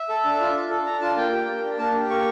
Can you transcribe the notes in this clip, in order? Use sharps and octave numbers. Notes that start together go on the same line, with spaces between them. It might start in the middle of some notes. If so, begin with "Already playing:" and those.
Already playing: E5
A4
D4
F4
D4
A4
D4 A#5
F4 A5
A#3 G5
G4
A#3
D4
A#3 A5
G4
A#3 C#6